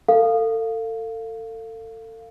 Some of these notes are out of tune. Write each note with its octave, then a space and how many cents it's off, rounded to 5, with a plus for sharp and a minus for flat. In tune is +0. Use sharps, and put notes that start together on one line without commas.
A4 +30 F5 +0